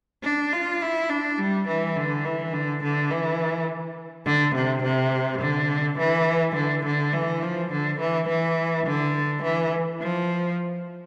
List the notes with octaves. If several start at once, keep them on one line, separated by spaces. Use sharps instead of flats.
D4
F4
E4
D4
G3
E3
D3
E3
D3
D3
E3
D3
C3
C3
D3
E3
D3
D3
E3
F3
D3
E3
E3
D3
E3
F3